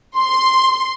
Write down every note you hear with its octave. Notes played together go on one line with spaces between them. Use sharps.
C6